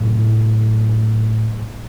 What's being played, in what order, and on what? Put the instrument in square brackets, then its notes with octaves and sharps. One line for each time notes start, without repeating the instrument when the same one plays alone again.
[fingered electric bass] A2 C3 F#3